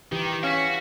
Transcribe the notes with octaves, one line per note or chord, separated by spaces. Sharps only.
D#3 E3 G4
C#4 F#4 F5 B6